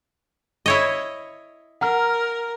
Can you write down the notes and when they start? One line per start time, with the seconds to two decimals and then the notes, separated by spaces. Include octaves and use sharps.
0.66 E4 C#5 D#5
1.81 A#4 F#5 A#5 F6